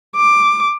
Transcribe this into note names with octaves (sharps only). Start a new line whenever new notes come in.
D6